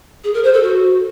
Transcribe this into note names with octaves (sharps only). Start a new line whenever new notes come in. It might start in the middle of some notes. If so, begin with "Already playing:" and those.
G#4
A#4
C5
A4
F#4